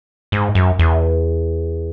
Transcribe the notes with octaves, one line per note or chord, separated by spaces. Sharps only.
G#2
F#2
E2